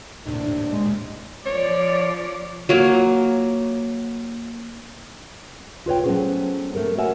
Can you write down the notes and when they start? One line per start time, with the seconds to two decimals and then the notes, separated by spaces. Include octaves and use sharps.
0.26 D#2 A2 C3 D4
0.68 G#3
1.46 F3 C#5 D5
2.69 F#3 A#3
5.86 F4 B4 C#5 G5
6.04 F#3 A3 B3 C#4 G#4 C5
6.75 A3 A4 A#4
6.97 F#4 A#4 C#5 E5 F#5 G#5